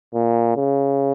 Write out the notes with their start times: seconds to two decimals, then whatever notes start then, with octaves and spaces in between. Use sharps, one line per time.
0.14 A#2
0.56 C#3